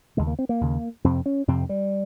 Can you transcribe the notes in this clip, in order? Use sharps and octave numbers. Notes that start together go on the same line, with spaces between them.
D#2 C#3 G#3
A#3
C4
A#3
D#2 C#3
F2 C3 C4
C#4
F2 C3 C4
G3